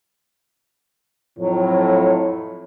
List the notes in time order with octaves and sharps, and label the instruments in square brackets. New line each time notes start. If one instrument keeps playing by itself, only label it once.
[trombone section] F2 A2 [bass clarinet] F#3